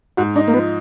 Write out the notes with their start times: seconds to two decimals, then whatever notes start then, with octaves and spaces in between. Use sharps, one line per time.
0.17 G#2 F#4
0.36 D4 D#4
0.48 A#3
0.53 F3 B3